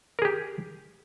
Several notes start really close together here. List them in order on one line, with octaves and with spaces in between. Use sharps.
A#4 G#4 G4